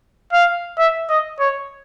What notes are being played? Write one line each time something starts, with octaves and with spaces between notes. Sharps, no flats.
F5
E5
D#5
C#5